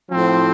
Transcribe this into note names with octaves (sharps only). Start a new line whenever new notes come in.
A2 F3 C4